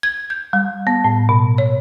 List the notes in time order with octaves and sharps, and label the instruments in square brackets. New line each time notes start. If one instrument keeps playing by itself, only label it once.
[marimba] G#6
G6
G3
B3
A2
B2
C#5